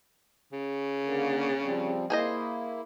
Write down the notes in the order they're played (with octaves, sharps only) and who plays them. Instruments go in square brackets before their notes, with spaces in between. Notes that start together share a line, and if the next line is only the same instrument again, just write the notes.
[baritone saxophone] C#3
[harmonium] D3 A#3
F3 G3 C4
[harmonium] A#3 E4 [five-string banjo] G#4 C5 D#5